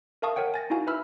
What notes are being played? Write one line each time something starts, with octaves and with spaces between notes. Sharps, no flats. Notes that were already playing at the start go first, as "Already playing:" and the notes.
A#4 E5 F5 A5 C#6 D#6
A#4 C#5 F#5 G5
G#5 A6 A#6
D#4 E4 F#4 F5 G#5 A#5
B4 E5 B5 E6 F6